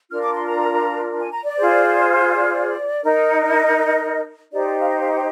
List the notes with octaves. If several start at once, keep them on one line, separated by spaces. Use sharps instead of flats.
D4 F4 A#4 F6
D6
C6
A#5
G#5
A#5
D5
F4 G#4 C5
D5
D#4 A#4
D#5
D#4 G4 C5 D5
F5
D#5
F5
G5